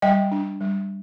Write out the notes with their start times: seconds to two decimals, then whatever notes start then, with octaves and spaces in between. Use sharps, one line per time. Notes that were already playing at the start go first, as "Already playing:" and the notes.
0.02 G3 D#5 G5
0.32 D4
0.61 G3